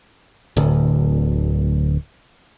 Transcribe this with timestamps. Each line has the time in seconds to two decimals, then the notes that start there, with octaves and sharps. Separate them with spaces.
0.57 D1 D2